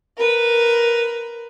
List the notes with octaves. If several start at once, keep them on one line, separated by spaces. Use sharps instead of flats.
A#4 B4